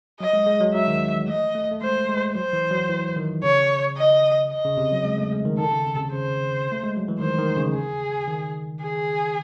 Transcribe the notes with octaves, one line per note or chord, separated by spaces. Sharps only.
F#3 D#5
G#3
G#3
F#3
F#3 E5
D#3
E3
A3 D#5
A3
A3
G#3 C5
G#3
F#3 C5
E3
F#3
E3
D#3
C#3 C#5
D#5
D#5
C#3
C3
F#3
G#3
A3
G#3
D#3
D#3 A4
C#3
C#3
C3
C#3
C#3 C5
A3
G#3
F#3
E3
D#3 C5
D#3
C#3
G#4
D#3
G#4